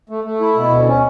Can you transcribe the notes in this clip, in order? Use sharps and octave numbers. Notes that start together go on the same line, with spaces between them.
A3
A3
E4
B2
D2
C#4